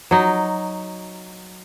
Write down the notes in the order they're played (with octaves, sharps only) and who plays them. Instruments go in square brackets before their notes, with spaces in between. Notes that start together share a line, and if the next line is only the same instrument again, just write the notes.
[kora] F#3 D#4